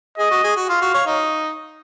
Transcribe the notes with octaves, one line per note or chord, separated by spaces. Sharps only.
G#4 D#5
F#4
G#4
F#4
F4 F5
F#4
C#5
D#4